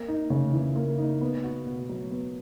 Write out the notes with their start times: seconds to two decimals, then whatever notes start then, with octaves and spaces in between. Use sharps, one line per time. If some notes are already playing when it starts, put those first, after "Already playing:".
Already playing: A#3
0.08 D#4
0.30 C#3
0.53 E3
0.76 A#3
0.99 D#4
1.21 B3
1.43 F#4
1.66 B2
1.89 F#3
2.11 B3